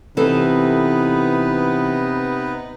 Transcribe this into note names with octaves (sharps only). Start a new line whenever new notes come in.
C3 E3 B3 D#4 A4 B4